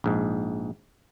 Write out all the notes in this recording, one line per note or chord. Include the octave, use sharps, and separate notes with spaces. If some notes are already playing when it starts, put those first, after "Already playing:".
A#1 G#2